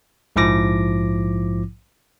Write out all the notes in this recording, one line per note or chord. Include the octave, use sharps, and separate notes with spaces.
A#1 G#2 F3 E4 D6 A#6